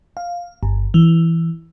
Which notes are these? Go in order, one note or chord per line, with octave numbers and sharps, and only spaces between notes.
F5
G1
E3